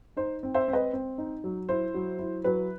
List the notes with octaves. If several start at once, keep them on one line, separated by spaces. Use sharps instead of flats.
D#4 C5
C4
C5 E5
C4
B4 D#5
C4
D#4
F#3
E4 C5
F#3
E4
F#3 B4